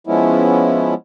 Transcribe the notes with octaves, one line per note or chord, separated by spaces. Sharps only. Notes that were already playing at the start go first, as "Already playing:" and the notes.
F3 G#3 B3 C#4 E4